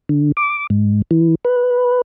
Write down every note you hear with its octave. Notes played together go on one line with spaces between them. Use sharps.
D3
D6
G#2
E3
B4